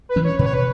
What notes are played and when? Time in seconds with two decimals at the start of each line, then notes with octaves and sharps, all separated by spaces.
0.09 B4
0.16 E3 C#4
0.24 C#5
0.39 B2 B4
0.46 C#5
0.54 B4